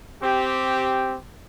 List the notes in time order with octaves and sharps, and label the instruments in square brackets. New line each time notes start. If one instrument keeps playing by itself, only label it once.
[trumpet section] C4 G4